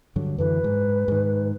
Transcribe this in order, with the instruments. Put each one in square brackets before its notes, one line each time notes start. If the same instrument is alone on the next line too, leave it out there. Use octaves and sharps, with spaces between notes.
[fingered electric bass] G2 D3 F#3
[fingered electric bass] F#2 D3 E3 [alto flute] B4
[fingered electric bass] G#2
G#2 D#3